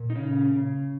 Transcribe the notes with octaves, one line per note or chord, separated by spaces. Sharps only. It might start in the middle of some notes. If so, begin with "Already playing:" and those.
Already playing: A#2
D#4
C#3 C#4
C#3